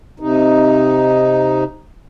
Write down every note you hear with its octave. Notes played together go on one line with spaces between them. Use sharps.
C3 D#4